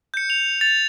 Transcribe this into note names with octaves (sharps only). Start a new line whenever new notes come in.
G6 C#7
F7
A6 F7